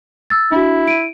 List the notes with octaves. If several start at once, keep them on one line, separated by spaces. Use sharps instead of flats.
E6 A6
D4 E4 F#4
D7 D#7